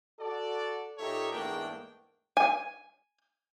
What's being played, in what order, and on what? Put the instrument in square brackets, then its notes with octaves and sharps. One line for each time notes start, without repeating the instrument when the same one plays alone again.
[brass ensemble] F#4 A4 D5
A#2 D#4 G4 A4 C#5 E5
E2 G#2 A3 A#3 D4 G5
[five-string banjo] G#5